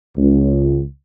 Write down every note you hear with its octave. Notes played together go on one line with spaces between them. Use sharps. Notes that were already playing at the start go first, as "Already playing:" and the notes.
C#2